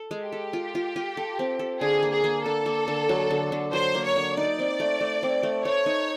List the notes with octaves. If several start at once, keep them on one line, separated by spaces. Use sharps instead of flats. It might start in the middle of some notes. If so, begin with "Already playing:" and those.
Already playing: A4
G#3
G4
A4
F4
F4
F4
A4
C4
A4
D3 G#4
A#3
G#4
A#3
D3 A4
A#3
D3
F#3
D3
D3
F#3 C5
A#3
C#5
D3
D#4 D5
C4
A3
A3
C4
A3
A3 C#5
D#4